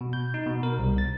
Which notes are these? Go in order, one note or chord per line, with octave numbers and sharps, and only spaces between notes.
B2
G6
D#4
B2
A#4
C2
A6